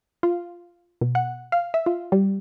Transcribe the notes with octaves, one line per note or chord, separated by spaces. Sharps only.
F4
B2
F#5
F5
E5
F4
G3